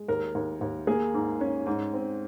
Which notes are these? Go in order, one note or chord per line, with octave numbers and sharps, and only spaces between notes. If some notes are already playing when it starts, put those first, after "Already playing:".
Already playing: G#3
D#2 A#4
D#2
D#2
A#3 G#4
G#2
C#4
G#2
C4